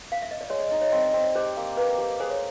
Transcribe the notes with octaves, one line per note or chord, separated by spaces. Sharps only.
F5
E5
D#5
D5
G#3 C#5
D5
D#4 D#5
C#5
C4 D5
D#5
C4
D5
G4 C5
A#3
A#3 B4
G4
G#4 C5
C#5